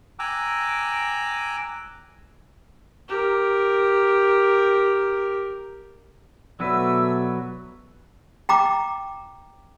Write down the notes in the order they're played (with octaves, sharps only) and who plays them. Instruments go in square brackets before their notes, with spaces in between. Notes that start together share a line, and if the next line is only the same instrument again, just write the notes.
[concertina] G5 G#5 A#5 D6 E6 F#6
[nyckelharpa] G4 A#4
[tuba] B2 [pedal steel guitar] F#3 F#4 B4 [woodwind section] A3 D5 E6
[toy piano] G5 A#5 D6